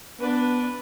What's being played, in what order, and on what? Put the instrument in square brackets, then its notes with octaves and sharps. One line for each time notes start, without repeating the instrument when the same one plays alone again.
[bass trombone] B3 [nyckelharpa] D4 B4